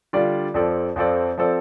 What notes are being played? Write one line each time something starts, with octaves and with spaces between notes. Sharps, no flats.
D3 G3 D4 F4 D5
F2 F3 C4 A4 D5
F2 F3 C4 A4 D5
F3 C4 A4 D5